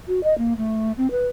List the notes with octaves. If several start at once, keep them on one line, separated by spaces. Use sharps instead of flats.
F#4
D#5
A#3
A3
C4
B4